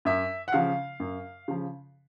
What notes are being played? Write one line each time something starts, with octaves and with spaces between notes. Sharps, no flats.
F#2 E5
F#5
C#3 F3 F5
F#2
C#3 F3